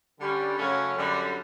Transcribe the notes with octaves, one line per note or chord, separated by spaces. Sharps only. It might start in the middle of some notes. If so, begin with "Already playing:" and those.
D3 G3 C#4
F#2 C#3 F#3 A3 C#4
F#2 D3 G3